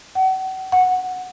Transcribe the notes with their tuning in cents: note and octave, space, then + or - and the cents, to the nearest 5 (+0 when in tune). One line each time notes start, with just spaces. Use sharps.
F#5 +35
F#5 -5